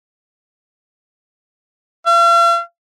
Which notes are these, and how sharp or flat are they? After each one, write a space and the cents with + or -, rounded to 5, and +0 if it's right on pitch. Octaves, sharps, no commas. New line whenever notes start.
F5 -45